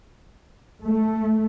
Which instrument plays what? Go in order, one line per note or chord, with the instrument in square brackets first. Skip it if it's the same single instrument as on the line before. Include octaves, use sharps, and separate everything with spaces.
[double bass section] A3